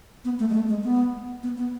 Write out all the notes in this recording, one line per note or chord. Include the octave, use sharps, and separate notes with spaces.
B3
A3
G#3
A3
G#3
B3
B3
B3